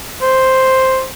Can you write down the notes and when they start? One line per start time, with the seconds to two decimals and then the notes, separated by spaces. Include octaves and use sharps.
0.22 C5